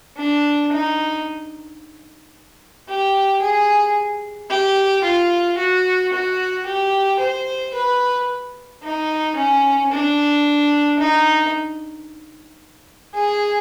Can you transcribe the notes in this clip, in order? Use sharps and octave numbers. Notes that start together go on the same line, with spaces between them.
D4
D#4
G4
G#4
G4
F4
F#4
F#4
G4
C5
B4
D#4
C#4
D4
D#4
G#4